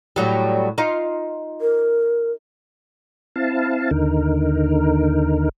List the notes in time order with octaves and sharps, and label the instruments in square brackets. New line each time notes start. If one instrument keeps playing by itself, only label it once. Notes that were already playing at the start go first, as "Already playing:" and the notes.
[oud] A2 F#3 G3
D#4 F4
[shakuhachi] A#4
[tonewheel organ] C4 E4 F5 A5
D#2 D3 D#4 A#4